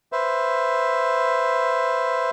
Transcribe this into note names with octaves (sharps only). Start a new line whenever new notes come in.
B4 C5 E5